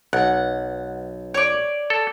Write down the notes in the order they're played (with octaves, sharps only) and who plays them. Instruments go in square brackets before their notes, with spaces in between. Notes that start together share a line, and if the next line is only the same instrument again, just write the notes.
[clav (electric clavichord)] B1 [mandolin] F#5
[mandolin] C#5 D5
[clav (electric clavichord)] A4